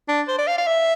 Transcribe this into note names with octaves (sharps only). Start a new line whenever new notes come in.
D4
C5
D5
F5
F5
E5